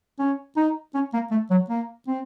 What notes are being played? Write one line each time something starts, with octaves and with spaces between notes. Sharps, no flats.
C#4
D#4
C#4
A#3
A3
F#3
A#3
C4